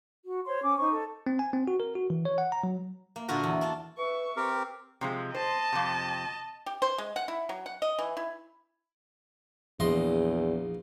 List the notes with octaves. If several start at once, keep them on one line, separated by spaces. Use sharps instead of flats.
F#4
C5 C#5 C6
C#4 D6
D#4 C5 C#6
A4
C4
G#5
C4
F#4
A#4
F#4
E3
C#5
F#5
A#5
F#3
A#3
A#2 D3 F4 F#4 A#4
E2
D4 F4 A5
B4 E5 C#6
C4 G4 A#4
C3 F3 G#3
C5 D#5 A5
F2 C3
G4
C5
G#3
F#5
E4
F#3
F#5
D#5
E3
E4
A#1 E2 D#5 C6